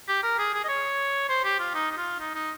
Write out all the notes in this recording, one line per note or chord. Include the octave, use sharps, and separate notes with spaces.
G4
A#4
G#4
G#4
D#5
C#5
C5
G4
F4
D#4
D#4
F4
D#4
D#4